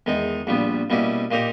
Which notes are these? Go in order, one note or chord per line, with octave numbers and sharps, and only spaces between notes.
E2 D#3 G#3 D#4
A#1 A#2 G3 B3
B2 G3 A#3 C#4 E4
A#2 A#3 D#4 G4 A#4